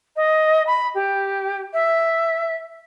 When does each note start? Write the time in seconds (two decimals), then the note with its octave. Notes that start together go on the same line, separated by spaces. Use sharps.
0.16 D#5
0.66 B5
0.94 G4
1.73 E5